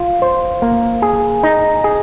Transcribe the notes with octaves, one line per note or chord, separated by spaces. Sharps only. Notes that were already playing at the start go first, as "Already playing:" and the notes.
Already playing: F4
C5
A#3
G#4
D#4
G#4